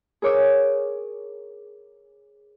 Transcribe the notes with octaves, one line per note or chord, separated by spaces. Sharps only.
G#4 A#4 C#5 D6 E6